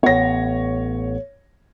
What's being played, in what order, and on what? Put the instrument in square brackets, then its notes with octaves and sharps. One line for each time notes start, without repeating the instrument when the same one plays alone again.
[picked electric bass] A1 B3 [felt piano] C#5 A#6